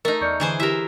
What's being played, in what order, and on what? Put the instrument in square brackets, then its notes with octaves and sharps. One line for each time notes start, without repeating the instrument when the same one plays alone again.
[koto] A3 D#4 [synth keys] A#4
[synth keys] E2 D5 F6 [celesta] C#6 G6 C#7
[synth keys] D3 [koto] E3 G#4 C5
[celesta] E4 G4 [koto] A#4 E5